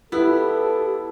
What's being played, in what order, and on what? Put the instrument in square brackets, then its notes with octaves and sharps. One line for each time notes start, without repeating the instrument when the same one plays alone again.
[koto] B3 [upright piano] E4 [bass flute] G4 [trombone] A4